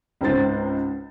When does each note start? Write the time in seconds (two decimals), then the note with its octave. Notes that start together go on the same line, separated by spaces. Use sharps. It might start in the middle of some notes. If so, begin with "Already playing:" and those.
0.21 C#2 G#2 C4 C5 A6